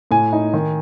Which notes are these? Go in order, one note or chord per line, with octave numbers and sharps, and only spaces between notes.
A2 G#5
D#4
D#3